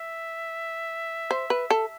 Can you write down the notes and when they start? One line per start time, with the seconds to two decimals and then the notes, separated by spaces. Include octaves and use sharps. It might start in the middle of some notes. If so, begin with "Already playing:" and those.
Already playing: E5
1.31 C5
1.50 B4
1.70 A4